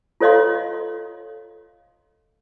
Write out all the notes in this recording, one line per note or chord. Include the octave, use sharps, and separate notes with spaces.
F4 A4 C#5 D#5 F5 C6